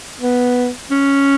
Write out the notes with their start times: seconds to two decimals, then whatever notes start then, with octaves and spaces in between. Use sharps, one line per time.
0.20 B3
0.91 C#4